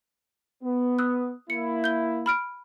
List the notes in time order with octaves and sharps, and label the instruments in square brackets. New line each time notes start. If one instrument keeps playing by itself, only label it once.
[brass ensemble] B3
[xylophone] D#6 E6 F#6
[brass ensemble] A#3 E4 [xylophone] C#7
[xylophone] G6 G7
B5 F6 D7